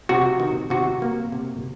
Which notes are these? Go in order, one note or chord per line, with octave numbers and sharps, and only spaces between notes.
C3 F#4
D#3
C3 F#4
A#3
C3